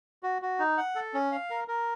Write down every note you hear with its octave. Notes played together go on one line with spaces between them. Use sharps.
F#4
F#4
D#4
F#5
A4
C#4
F5
A#4
A#4